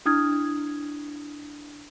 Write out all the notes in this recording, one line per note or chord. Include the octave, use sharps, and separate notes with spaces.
D4 E4 D#6 F6 G#6